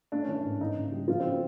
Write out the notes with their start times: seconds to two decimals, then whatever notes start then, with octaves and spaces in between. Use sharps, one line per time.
0.12 A3 D4
0.22 C#4
0.28 E3 D4
0.44 G#2
0.60 E3 D#4
0.77 C#3
0.92 G3
1.08 F3 F4
1.20 C4
1.24 C#3
1.32 C4